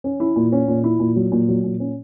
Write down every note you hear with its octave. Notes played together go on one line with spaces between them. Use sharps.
C#4
E4
A#2
C#4
A#2
E4
A#2
F#3
A#2
F#3
A#2
C#4